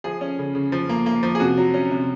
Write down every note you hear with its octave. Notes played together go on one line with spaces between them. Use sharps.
F3 G#4
C#4
C#3
C#3
F3
A#3
A#3
F3
G#4
C3 F#4
F#3
C#4
C3